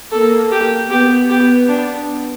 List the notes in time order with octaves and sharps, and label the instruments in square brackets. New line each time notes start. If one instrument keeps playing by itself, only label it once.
[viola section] A#3 [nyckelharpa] A4
[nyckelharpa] G4
[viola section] B3 [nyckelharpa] G4
[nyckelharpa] G4
D4